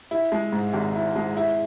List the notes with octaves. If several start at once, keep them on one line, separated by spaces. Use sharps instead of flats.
E4
G#3
G#2
G#1
E4
G#3
E4